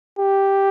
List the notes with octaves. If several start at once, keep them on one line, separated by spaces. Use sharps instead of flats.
G4